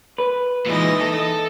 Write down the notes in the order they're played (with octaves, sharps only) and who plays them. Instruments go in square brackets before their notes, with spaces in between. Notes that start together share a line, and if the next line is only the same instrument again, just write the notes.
[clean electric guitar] B4
[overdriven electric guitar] A#2 G#3 [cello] E3 D#4
[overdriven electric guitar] A4